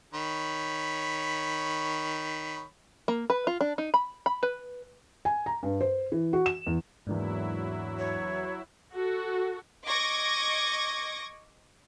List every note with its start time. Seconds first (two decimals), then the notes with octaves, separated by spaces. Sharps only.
0.14 D#3 C#5 B5
3.08 A#3
3.30 B4
3.47 F4
3.61 D4
3.78 D#4
3.94 B5
4.26 B5
4.43 B4
5.25 G#5
5.46 A#5
5.63 G2
5.81 C5
6.12 E3
6.33 F#4
6.46 E7
6.67 E2
7.07 E2 G#2 F#3 A#3 D4 E4
7.99 C#5
8.92 F#4 A4
9.87 D#5 C#6 D6 G#6 A#6